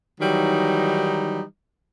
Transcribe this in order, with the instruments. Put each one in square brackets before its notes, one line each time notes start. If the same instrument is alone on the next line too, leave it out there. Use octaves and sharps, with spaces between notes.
[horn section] D#3 E3 F#3 G3 D#4